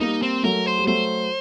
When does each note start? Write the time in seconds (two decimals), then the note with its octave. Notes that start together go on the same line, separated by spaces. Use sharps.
0.01 G3 A#3 D#4
0.22 C4
0.43 F#3 A3 A#4
0.66 C5
0.78 G3
0.87 F#3 A3 C5